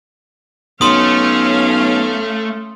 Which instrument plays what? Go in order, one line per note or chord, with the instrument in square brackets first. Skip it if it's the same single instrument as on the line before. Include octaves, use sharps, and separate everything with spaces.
[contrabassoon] B1 [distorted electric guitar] A3 [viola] C#4 F5 [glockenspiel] C6 D#6